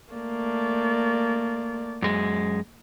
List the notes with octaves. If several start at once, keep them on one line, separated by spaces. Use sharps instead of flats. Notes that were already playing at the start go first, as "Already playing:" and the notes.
A3 A#3 D5
F#2 G#3